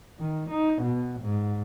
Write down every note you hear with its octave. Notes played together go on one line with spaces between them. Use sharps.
D#3
D#4
B2
G#2